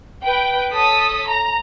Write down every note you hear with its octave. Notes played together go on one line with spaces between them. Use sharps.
B4 G5
A4 C#5 D#6 B6
A#5